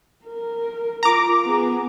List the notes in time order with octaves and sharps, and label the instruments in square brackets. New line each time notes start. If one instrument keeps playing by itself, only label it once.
[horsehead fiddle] A#4
[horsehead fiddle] F4 A#4 [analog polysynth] A#5 D6
[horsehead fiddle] B3 G#4